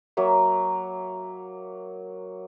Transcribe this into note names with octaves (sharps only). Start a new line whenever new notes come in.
F#3 A#3 E5